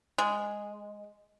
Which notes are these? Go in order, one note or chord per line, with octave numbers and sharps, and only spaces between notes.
G#3